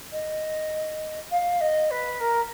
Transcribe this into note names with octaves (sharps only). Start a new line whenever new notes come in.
D#5
F5
D#5
B4
A#4